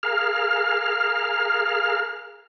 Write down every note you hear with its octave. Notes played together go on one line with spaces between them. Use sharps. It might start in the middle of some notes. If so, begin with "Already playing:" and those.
G#4 A#4 F5 F6